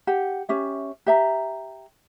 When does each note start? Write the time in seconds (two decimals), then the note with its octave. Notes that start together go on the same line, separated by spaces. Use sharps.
0.07 G4 F#5
0.49 C#4 G4 E5
1.06 G4 E5 A#5